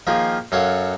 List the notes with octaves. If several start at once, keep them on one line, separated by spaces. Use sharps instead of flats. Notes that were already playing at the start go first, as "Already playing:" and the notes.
D#3 F3 A#3 F4 G#4
F#2 A4 C#5 F5 F#5